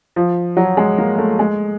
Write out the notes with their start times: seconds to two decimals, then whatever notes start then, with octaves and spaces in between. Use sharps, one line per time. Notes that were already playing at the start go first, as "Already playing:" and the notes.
0.16 F3
0.57 F#3
0.77 G#3
0.98 A#3
1.18 A3
1.39 G#3